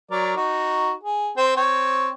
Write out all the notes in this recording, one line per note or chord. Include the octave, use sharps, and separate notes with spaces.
F#3 A#4 D5
D#4 F#4
G#4
C4 C5
C4 C#5